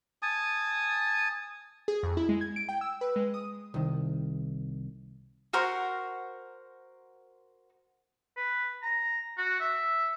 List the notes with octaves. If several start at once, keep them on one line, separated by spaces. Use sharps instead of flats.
G#5 A5 D#6
G#4
F2
E4
G#3
G#6
D7
G5
E6
B4
G#3
D#6
C2 D#3
F#4 A#4 C5 F#5
B4
A#5
F#4
E5